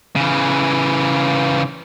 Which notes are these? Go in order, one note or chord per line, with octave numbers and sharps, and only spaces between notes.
C#3 E3